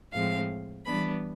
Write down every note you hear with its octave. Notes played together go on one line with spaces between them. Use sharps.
A2 F3 G#3 C4 F5
E3 G3 B3 D4 B5